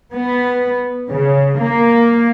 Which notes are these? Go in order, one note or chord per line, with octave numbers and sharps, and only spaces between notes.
B3
C#3
A#3